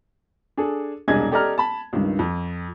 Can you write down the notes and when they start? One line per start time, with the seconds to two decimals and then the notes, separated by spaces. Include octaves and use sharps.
0.57 D4 G#4 A4
1.08 E1 C2 D4 G#4 D#5 G#6
1.31 G4 A4 D5 D#5 A#5 F6
1.58 A5 B5
1.93 C#2 G2 D#3
2.19 F2